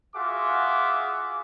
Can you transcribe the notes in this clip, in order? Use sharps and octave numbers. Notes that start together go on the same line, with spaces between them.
F4 F#4 G#4 E5 D6